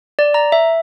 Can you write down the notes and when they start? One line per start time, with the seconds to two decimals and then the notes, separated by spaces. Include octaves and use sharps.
0.19 D5
0.34 A#5
0.52 E5